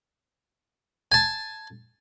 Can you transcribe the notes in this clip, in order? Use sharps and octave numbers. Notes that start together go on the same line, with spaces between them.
G#5 A5